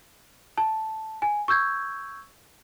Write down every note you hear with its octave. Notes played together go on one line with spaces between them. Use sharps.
A5
G#5
C#6 E6 G6 G#6